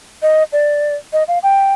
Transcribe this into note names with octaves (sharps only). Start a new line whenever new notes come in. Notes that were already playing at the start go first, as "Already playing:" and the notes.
D#5
D5
D#5
F5
G5